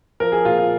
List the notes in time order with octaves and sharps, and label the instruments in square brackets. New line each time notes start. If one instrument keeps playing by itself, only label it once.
[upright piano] F3 A#4
G#4
A#2 F4
F4